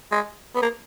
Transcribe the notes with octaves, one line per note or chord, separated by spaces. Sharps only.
G#3
B3
A#3